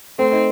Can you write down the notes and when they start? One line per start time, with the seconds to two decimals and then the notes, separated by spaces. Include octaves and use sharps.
0.18 A3 C4
0.33 D#4